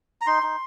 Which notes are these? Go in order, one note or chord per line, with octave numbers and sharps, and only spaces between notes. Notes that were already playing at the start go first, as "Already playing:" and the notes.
A#5
D#4 C6
D#4